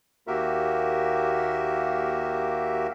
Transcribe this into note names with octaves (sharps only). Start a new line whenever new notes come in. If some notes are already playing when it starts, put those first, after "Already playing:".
D#2 A#3 F#4 G4 A#4 E5